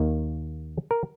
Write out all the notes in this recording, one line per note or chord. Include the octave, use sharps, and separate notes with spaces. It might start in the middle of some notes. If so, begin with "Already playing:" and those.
Already playing: D#2 D#3 A#3
A#4